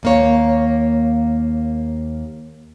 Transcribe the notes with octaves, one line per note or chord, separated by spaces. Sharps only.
D#2 A#3 C#5